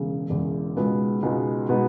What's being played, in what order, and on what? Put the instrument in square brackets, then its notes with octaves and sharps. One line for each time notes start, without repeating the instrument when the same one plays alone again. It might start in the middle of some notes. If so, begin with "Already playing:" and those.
Already playing: [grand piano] E1 E2 C#3
E1 E2 C#3
C#2 B2 G#3 B3 D#4
C#2 B2 G#3 B3 D#4
B2 G#3 B3 D#4